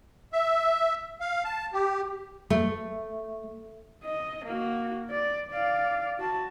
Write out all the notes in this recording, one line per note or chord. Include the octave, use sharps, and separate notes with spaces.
E5
F5
A5
G4
A3
D#5
A#3 F#4
D5
D5 F5
F#4 A5